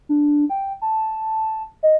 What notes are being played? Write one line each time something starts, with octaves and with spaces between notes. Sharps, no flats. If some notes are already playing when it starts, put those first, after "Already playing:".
D4
G5
A5
D#5